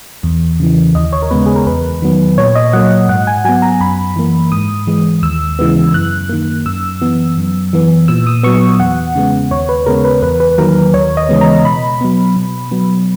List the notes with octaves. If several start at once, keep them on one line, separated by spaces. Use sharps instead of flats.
E2
C#3 E3
D#2 D#5
C#5
A#4
C#3 G#3 B3 B4
G#4
A#4
E2 B4
D#3 F#3 B3
A#2 C#5
D#5
F#3 A#3 F#5
G#2 F#5
G#5
F#3 B3 G#5
A#5
F#2 B5
E3 A#3
G#2 D#6
E3 G#3
D#2 E6
C#3 E3 G#3 B3
F#2 F#6
D#3 A#3
F#2 E6
E3 B3
F#2
E3 B3
A#2 E6
D#6
F#3 B3 C#6
E2 F#5
C#3 G#3 B3
D#2 C#5
B4
C#3 G#3 B3 A#4
B4
E2 B4
B4
D#3 F#3 A#3 A#4
D#2 C#5
D#5
C#3 E3 G#3 B3
A#5
B2 B5
F#3 B3
B2
F#3 B3